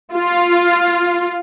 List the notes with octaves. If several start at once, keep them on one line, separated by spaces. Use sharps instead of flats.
F4